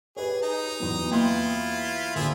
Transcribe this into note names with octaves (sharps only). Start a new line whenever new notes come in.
G4 G#4 B4 C#5
D#4 A#5
E2 F#3 B3
A#3 E4 F4 C6
D2 D3 F3 A#3 G#4 E5